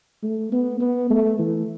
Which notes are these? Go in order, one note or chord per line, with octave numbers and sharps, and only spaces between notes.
A3
B3
B3
A3
E3